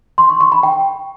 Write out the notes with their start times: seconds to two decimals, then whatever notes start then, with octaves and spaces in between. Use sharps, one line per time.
0.18 C6
0.29 C#6
0.41 C#6
0.52 B5
0.63 G5